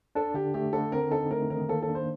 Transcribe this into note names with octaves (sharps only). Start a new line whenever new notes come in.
D4 A4
D3 G4
A3 G4
D3 A4
C4 A#4
D#4 A4
A3 A#4
D#3 A#4
A#3 A4
A4
D4
C5